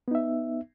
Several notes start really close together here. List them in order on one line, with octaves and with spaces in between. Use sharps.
B3 D#4 E5